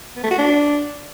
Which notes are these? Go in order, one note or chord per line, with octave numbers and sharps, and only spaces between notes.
B3
A3
F#4
D4